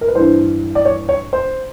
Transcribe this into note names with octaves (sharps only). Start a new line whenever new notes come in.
A#4
B4
G2 E3 C5
D5
C#5
C#5
C5